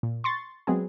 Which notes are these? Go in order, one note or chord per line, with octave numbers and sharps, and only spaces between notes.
A#2
C6 C#6 A6
F#3 G#3 B3 C4 G#4